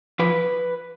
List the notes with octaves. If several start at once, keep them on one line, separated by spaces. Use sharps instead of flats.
F3 B4